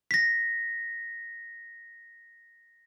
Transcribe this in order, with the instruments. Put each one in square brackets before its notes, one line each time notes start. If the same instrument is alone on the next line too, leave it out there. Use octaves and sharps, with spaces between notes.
[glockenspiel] A#6 B6